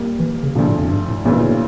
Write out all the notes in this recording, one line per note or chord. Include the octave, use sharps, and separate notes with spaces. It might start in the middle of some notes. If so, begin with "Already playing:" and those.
Already playing: A#2 G3 A#3
E3
C#3
D2 A#2 D3 F3
A2
F2
G2
A2
D2 A2 C#3 E3 A#3
A#2